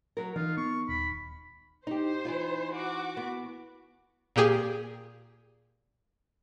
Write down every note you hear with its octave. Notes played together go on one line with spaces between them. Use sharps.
F#3 A#4
E3 D#4 F4
B3 C#6
D#1 B5
D#4 G4 C5
E3 D#4 F4
F#4 D6
B3
A#2 A#3 G4 G#4